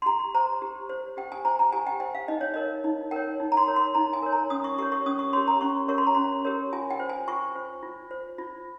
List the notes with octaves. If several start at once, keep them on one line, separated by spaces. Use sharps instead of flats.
C6
G4 A#5
C5 A#5
G4
C5
G4 G5
G#5
C5 A#5
A#5
G4 G#5
G5
C5 G5
F5
D#4 D#5
C#5
A#4 C#5 D#5
D#4
A#4 C#5 G5
D#4
A#5
C6
A#4 C#5
C6
D#4 A#5
G#5
A#4 C#5
A#5
C#4 D#6
C#6
G4 A#4 C#5 C#6
C#6
C#4 D#6
C#6
G4 A#4 C#5 C6
A#5
C#4 C#6
G4 A#4 C#5 C#6
C6
A#5
C#4 C6
G4 A#4 C#5
F4 G#5
G5
C5
G#5
F4 C#6
C5
F4
C5
F4